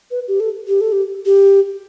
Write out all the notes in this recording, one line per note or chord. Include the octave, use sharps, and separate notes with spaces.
B4
G4
A4
G4
A4
G4
G4